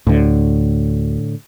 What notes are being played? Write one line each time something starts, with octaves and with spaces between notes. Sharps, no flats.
D2 A2 D3